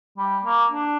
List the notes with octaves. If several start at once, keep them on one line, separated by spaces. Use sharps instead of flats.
G3
A#3
D4